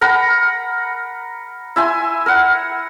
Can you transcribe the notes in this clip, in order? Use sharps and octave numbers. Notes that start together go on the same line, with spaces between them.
A#4 F#5 A#5 B5
E4 E5 G#5 C6
A#4 F#5